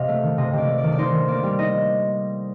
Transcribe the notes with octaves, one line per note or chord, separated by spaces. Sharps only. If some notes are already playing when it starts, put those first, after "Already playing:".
Already playing: C3 D#5 F5
A3
D#3
C3 D#5
C3 D5
A3
D5
D#3
D5
D#4 C5
D#3
A#3 D5
G3
D#4 D#5